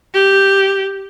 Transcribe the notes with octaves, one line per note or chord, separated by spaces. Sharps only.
G4